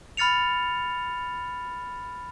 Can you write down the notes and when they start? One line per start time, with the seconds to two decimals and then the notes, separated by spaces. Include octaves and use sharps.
0.17 B5 F6 A6 C#7 F7